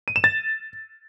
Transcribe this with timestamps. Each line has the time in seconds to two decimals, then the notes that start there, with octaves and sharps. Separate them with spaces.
0.08 D#7
0.16 E7
0.24 A6